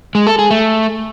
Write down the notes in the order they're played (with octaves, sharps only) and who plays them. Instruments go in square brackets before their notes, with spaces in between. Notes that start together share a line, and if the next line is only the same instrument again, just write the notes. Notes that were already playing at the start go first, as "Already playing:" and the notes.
[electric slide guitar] G#3
A4
G#4
A3